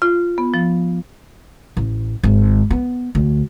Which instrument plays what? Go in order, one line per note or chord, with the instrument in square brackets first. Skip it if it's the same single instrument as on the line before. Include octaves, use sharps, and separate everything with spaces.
[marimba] F4
B3
F3
[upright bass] A1
G#1
B3
D2